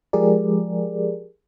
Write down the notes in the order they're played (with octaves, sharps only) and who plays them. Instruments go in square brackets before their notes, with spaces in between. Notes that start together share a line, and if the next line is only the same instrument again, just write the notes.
[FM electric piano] F3 G#3 G4 G#4 A#4 D5